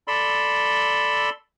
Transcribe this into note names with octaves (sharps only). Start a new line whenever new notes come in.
A4 D5 B5 C6 E6